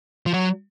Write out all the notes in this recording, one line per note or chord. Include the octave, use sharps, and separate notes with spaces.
F3
F#3